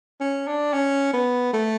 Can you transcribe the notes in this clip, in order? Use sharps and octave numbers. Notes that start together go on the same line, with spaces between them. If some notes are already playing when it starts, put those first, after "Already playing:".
C#4
D4
C#4
B3
A3